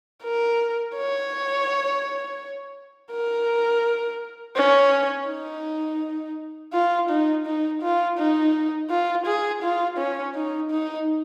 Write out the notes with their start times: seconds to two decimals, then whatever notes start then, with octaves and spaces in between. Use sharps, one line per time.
0.23 A#4
0.96 C#5
3.11 A#4
4.56 C#4
5.28 D#4
6.74 F4
7.10 D#4
7.46 D#4
7.82 F4
8.18 D#4
8.90 F4
9.26 G#4
9.63 F4
9.98 C#4
10.35 D#4
10.71 D#4